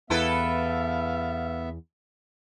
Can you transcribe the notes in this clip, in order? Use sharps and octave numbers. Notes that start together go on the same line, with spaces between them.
E2 B3 E4 A4 B4 E5 F5